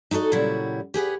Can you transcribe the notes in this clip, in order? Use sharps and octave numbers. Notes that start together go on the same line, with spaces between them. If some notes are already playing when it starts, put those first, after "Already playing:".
D#4 E4 F#4 A4 D#5
A#2 C#3 F#3 G3 E4 F#5
G4 G#4 B4 F#5